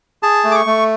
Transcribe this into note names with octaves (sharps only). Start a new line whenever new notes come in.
G#4 A5
A3
D6
C#6
A3